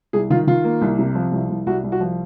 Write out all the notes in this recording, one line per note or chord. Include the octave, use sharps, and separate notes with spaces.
C2 G#4
D#3 F4
D#3 F4
A#3
C2
C3
F3
C2
C2
C2 F#4
C2
F#4
F3